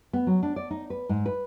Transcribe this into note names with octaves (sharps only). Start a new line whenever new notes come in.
B3
F#3
D4
D5
D#4
B4
G#2
B4